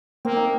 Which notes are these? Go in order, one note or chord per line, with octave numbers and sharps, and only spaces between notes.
A#3 C4
D#4